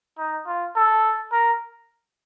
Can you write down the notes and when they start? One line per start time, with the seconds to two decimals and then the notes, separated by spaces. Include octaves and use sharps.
0.18 D#4
0.47 F4
0.75 A4
1.32 A#4